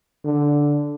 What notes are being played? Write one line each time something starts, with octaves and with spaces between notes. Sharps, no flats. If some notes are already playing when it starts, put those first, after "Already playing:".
D3